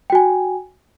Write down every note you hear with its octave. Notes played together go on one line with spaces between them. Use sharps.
F#4 G5 G#5